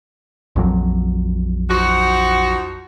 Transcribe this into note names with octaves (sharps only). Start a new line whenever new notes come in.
A#1 F2 F#3
F3 D#4 F#4